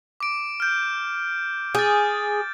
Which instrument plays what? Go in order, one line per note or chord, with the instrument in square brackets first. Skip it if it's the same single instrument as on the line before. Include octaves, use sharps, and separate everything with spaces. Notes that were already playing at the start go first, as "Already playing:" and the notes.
[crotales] D6 D7
F6 G6
[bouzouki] G#4 [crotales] G6 A6